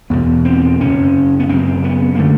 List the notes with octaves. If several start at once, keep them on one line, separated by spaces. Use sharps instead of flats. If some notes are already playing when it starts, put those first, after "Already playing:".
E2 B2 B3
C4
F#2 C#3 C#4
B3
F#2 C#3 C4
B3
A#3
D3 A3